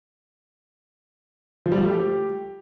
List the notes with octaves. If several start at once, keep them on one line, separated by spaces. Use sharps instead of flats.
F3
G3
F3
A3
G4